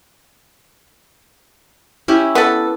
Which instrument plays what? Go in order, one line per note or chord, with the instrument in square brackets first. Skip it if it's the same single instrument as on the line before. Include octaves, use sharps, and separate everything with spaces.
[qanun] C#4 E4 G4
[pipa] B3 A4